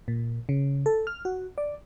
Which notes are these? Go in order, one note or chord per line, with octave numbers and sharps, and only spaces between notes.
A#2
C#3
A4
F6
F#4
D5